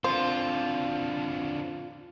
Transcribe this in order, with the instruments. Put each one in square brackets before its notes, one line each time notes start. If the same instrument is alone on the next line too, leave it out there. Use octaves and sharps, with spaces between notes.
[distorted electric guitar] D3 F3 [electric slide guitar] C4 [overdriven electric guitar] F4 [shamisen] C5